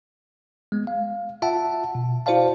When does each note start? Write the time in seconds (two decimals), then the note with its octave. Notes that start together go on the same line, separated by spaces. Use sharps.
0.72 G#3 B3
0.87 F5
1.42 F4 E5 F#5 A5
1.95 B2
2.26 E4 F#4 C5 D5 F5 A5